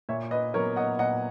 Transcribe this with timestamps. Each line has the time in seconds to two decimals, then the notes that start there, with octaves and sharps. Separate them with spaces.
0.09 A#2 C#5 E5
0.31 B4 D#5
0.54 F#3 B3 D#4 A#4 C#5
0.76 D#5 F#5
0.99 A#2 D#5 F#5